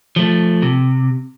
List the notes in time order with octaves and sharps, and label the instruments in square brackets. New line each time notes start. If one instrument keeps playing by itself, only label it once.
[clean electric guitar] F3 A3
C3